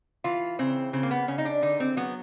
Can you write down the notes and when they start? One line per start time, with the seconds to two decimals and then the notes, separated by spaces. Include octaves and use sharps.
0.24 E3 F4
0.59 C#3 C4
0.93 C#3 C4
1.03 A#3
1.11 B3
1.28 C#3 C#4
1.38 D#4
1.45 D4
1.62 D3 D#4
1.80 C4
1.97 F#3 B3